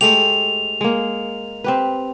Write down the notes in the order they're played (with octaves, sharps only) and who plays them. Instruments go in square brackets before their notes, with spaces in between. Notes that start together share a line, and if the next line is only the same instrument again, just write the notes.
[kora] G#3 A3 G4 [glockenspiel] F7
[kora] G#3 A#3
C4 G4 B4